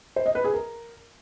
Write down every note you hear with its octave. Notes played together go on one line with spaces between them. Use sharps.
C5
D#5
B4
G#4
A#4